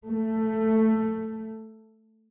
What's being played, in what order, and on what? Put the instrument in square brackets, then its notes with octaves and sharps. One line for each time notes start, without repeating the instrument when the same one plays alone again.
[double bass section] A3